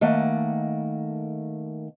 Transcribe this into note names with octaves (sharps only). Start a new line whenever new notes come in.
D#3 A3 A#3 F#5